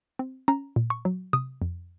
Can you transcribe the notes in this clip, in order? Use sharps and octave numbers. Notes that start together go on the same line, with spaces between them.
C4
C#4 A#5
A#2
C#6
F#3
C3 D#6
F2